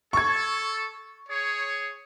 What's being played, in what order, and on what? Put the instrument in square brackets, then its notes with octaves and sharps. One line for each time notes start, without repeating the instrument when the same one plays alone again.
[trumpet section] A4 [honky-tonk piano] C#6 G#6
[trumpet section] G#4 C#5